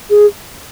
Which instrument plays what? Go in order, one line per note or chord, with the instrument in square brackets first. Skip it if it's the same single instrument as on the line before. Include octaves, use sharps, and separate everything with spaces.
[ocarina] G#4